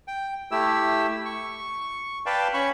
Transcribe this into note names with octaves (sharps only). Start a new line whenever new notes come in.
G5
A3 E4 G4 E6
C#6
B4 D5 F5 G5 A5
C#4 B5 C#6